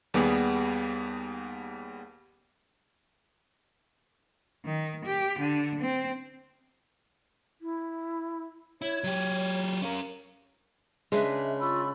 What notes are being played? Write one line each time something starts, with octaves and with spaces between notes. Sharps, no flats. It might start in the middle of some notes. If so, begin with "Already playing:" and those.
D#2 G3 B3 G4 G#4
D#3
G4
D3
C4
E4
E4 C#5
F#3 G4
C#4 A#4 F5
C#3 G#3 D4 B4 E5
F4 B5 C#6 E6